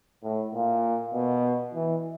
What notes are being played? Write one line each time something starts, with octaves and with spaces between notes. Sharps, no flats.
A2
A#2
B2
E3